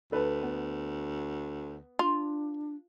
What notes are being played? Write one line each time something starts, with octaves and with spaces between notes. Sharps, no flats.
D2 A4 B4
B3
D4 F4